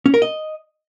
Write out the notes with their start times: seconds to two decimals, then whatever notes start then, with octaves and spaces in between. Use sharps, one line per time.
0.06 C#4
0.14 A#4
0.22 D#5